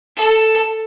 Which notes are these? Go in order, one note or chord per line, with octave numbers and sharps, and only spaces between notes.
A4